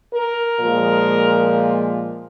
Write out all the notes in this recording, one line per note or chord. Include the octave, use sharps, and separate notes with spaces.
A#4
A#2 F3 G#3